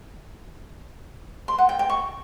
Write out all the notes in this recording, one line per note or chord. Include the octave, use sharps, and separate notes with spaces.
C6
F#5
G5
G5
C#6